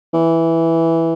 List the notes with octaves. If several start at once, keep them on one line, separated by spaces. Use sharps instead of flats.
E3